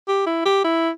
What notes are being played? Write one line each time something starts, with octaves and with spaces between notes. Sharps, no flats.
G4
E4
G4
E4